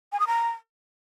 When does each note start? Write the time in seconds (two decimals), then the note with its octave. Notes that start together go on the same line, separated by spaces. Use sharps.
0.12 G#5
0.20 D#6
0.27 A#5